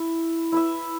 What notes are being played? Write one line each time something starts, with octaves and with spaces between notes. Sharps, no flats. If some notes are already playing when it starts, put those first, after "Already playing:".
Already playing: E4 E5
E4 B4 E5